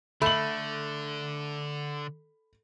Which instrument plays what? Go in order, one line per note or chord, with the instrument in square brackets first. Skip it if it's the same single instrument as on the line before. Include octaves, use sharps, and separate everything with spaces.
[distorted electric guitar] D3 [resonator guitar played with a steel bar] A3 [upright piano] B5 F#7